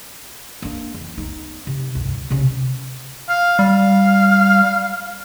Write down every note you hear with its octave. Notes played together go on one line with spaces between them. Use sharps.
A#3 D4
E2
B3 D#4
C3
D2 G2
C3 C#4
F5
G3 F5